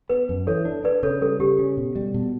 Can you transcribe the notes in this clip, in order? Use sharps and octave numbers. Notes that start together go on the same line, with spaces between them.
B3 B4
F#2
E3 A4 C#5
D4
D4 B4 D5
C#3 A4 C#5
G3 A4
C#3 G4
C#4
B2
G3
B2